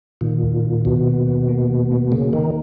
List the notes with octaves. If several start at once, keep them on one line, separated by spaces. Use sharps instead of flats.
A#2 D#3
D#2
D#2
D#2 B2
A#3
D#2
A#3
D#3
A#3
C#3 A#3
D#3 A#3